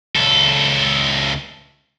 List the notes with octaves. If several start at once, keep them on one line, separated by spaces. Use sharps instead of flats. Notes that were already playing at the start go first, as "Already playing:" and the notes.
C#2 A4